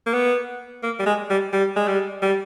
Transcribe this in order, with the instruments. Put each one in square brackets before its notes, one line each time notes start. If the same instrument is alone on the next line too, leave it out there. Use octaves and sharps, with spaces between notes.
[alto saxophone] A#3
B3
A#3
G3
G#3
G3
G3
G#3
G3
G3